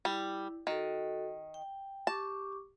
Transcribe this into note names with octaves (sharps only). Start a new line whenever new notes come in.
G3 E4
D#3 F#4 A4
G5
G4 A5 C#6 D6